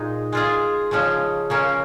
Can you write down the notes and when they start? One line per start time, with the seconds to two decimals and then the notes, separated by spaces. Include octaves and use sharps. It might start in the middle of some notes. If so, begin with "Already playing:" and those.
Already playing: A#2 G#3 D#4
0.33 G#3 F4 G#4
0.91 C#3 F3 G#3 C#4
1.50 C#3 A#3 C#4